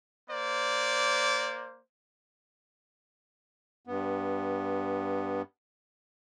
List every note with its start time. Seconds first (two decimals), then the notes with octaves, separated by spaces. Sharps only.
0.29 A#3 C5 D5
3.87 G2 B3